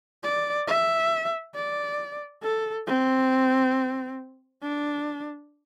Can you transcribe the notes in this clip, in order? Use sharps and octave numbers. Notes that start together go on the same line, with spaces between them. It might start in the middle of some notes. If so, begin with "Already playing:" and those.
D5
E5
D5
A4
C4
D4